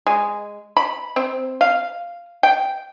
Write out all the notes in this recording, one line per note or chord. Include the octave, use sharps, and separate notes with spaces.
G#3
B5
C4
F5
G5